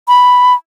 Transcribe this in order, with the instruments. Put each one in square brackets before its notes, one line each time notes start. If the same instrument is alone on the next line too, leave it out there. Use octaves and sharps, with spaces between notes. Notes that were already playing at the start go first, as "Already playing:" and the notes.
[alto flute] B5